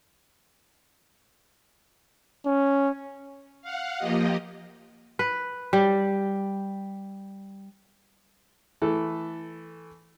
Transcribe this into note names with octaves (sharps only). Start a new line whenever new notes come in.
C#4
F5 F#5
F3 A#3 F4 G4 D#5
B4
G3
E3 A3 E4 A4